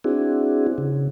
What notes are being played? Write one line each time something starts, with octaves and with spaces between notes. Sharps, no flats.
C4 D4 E4 F#4 G#4
C#3